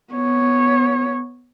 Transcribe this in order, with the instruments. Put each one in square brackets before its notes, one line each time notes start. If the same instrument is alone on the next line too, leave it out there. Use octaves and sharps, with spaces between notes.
[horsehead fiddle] B3 C#5